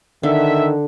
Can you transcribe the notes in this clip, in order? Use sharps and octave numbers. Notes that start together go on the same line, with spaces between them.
D3 D#3 E5